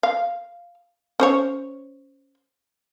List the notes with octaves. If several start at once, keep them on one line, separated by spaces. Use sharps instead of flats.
F5
C#4 C5 C#5